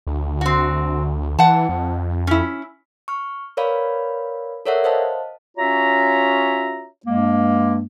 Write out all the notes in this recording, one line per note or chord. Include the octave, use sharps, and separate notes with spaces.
D2
C4 F#4
E3 F#5 A5
F2
C#4 E4
C#6 F6
A#4 B4 C#5 D5 F5 B5
A4 A#4 C#5 D5 E5 F#5
C5 D#5 F5 A5
C#4 F4 F#4 C#5 E5 A#5
G2 G#3 A#3